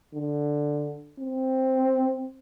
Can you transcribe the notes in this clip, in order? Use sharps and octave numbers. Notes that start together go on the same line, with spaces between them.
D3
C4